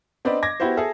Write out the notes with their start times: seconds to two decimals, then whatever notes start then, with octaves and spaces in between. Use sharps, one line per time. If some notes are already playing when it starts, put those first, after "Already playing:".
0.25 B3 C4 D4 B4 D5 D#5
0.42 D6 G#6 A#6
0.60 B3 E4 F#4 G4 C5
0.77 G#4 A4 E5